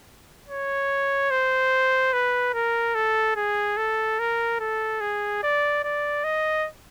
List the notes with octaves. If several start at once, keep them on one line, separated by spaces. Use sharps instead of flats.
C#5
C5
B4
A#4
A4
G#4
A4
A#4
A4
G#4
D5
D5
D#5